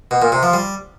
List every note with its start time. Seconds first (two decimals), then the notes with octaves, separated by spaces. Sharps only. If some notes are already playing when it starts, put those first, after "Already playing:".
0.11 B2
0.22 A#2
0.32 C3
0.43 F3
0.53 G3